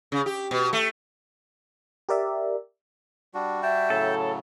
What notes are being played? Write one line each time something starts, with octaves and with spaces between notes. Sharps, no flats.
C#3
G4
B2
A3
G4 A#4 D5 E5
G3 D4 F#4
E5 G5 A5
A2 C#3 F#3 A4